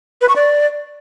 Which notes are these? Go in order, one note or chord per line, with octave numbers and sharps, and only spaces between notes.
B4
C#6
D5